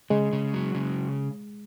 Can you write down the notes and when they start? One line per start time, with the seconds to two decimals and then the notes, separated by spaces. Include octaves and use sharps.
0.10 C#3 G#3
0.33 C#3
0.54 F#3
0.75 C#3